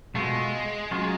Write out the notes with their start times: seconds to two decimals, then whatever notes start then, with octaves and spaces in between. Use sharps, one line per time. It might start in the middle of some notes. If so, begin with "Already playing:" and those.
0.15 B2 G#3 A3 F4
0.91 F#3 C#4 F4 G#4